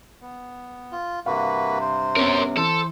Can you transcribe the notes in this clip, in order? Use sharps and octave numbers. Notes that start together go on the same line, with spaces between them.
B3
F4
G2 C3 A#3 F#4 B4 F5
C5
B3 C#4 A#4 C#5
E3 A4 C5